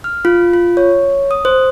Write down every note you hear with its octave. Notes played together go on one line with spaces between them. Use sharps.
F6
F4
F4
C#5
D#6
C5